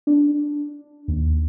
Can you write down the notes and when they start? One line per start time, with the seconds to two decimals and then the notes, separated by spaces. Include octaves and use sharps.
0.07 D4
1.08 D#2